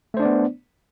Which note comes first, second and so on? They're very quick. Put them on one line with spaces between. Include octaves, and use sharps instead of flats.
A3 C5 D4 D5 B3